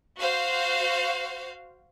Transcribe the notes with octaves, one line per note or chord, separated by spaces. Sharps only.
F#4 C5 F5